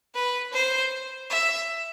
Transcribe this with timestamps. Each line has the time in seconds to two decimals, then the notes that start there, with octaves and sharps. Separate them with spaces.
0.15 B4
0.53 C5
1.30 E5